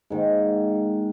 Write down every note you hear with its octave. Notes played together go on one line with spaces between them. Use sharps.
G#2 D#3 A#3